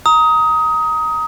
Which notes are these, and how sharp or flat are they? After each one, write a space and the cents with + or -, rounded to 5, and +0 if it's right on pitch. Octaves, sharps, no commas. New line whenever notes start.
A#5 +0 D#6 +20